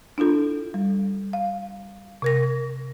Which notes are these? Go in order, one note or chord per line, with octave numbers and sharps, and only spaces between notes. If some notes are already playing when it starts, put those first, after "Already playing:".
D4 E4 F4 A4
G3
F5
C3 A#4 A#6